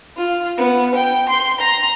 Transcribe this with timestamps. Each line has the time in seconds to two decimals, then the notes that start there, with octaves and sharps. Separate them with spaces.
0.17 F4
0.58 B3
0.95 G5
1.29 C6
1.61 A#5